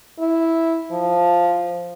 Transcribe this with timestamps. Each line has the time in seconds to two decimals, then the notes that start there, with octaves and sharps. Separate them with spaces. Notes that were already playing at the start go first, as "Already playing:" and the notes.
0.19 E4
0.92 F3